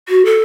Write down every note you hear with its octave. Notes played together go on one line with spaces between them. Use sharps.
F#4
A4